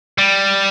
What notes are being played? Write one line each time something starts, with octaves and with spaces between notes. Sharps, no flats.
G3